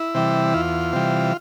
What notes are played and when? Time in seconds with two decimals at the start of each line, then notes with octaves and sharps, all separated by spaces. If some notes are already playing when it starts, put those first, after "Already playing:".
Already playing: E4
0.15 C3 E3 G3
0.54 E2 F4
0.93 C3 E3 G3